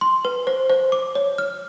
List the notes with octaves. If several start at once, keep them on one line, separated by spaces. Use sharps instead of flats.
C6
B4
C5
C5
D6
C#5
F6